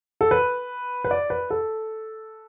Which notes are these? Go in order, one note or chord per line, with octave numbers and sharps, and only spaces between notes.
A4
B4
B4
D5
B4
A4